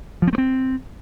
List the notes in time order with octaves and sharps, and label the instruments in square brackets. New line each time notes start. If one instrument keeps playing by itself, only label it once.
[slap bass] F3
C4
A3
C4